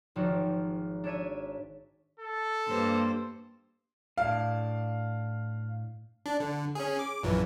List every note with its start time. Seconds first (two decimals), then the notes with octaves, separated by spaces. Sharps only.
0.16 G#1 F3 D#4 F#4 G4
1.04 D4 C#5 E5 D#7
2.20 A4
2.67 G2 A#3 C5
4.18 A2 D4 F5
6.26 D4
6.40 D3
6.75 C#4 G#4
6.99 D6
7.23 A#1 F#2 E3